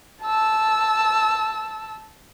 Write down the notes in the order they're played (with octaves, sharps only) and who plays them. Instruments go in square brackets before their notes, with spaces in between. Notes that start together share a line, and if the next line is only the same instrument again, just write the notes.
[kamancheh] A5 E6